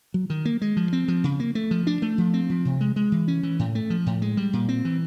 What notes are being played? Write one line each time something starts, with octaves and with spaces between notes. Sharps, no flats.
F#3
D#3
A#3
G#3
F3
C4
F3
C#3
A#3
A3
F3
D4
A3
F3
C4
F3
C3
G#3
G#3
E3
C#4
E3
A2
A3
F3
A2
G#3
G3
A#2
C4
E3